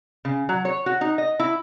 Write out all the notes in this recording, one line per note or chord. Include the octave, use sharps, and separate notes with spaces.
C#3
F#3
C#5
F#4
D#4
D#5
E4